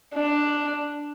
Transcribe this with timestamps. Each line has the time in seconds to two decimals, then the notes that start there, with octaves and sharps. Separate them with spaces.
0.14 D4